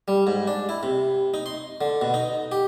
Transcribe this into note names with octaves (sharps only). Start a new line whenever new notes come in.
G3
G#2
D4
E4
C3
D#4
C6
D3
B2
D#4
G4